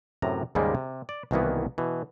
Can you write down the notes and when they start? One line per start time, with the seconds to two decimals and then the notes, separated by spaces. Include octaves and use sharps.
0.22 F#2 A2 C3 A#5
0.55 D#2 G#2 C#3 G3 G#3 A#3
0.75 C3
1.09 D5
1.31 C2 B2 D#3 E3 A#3 B3
1.78 B2 E3